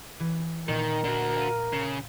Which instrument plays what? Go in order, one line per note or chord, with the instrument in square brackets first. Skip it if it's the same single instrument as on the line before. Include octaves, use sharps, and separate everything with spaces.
[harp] E3
[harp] A#2 D#5 [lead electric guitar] D#3 [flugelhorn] A#4
[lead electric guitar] D3 F#4
[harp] F5 D#7
[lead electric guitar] C#3